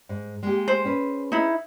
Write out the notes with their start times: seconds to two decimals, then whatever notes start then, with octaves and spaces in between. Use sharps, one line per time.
0.09 G#2
0.43 G#3 A#3 G4
0.68 C5
0.85 C#4 G#4 B4
1.32 D#4 E4